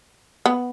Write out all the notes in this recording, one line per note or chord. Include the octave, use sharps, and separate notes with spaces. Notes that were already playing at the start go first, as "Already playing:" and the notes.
B3